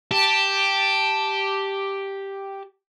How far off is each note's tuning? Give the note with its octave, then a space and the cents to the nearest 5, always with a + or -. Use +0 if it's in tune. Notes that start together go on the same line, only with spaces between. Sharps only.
G4 +0 A5 +0